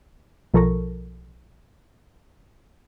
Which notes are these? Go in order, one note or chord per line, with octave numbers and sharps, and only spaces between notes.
B1 F3 A4 A#4 C#6 A#6